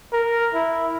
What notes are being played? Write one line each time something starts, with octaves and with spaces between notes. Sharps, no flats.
A#4
E4